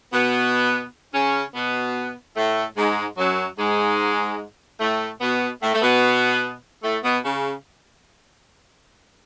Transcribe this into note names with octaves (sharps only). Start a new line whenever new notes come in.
B2 B3
C#3 C#4
B2 B3
A2 A3
G#2 G#3
F#2 F#3
G#2 G#3
A2 A3
B2 B3
A2 A3
A3
B2 B3
A2 A3
B2 B3
C#3